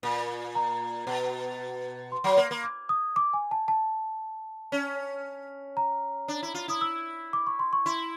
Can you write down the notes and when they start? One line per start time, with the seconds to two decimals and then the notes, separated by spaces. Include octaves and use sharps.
0.03 A#2
0.55 A#5
1.07 B2
2.12 C6
2.24 F#3
2.37 A#3
2.51 A#3
2.64 D6
2.89 D#6
3.16 D6
3.33 G#5
3.51 A5
3.68 A5
4.72 C#4
5.77 A#5
6.28 D4
6.43 E4
6.54 F4
6.68 E4 D#6
6.81 E6
7.33 D6
7.47 C#6
7.59 C6
7.73 C#6
7.86 E4 C6